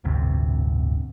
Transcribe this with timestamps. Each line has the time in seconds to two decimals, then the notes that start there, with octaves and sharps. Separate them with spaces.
0.04 D1 G1 D2 C3